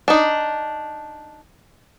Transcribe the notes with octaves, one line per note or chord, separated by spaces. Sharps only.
D4 D#4